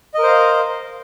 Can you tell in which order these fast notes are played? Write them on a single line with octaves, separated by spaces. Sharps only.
D#5 A#4 C5 F5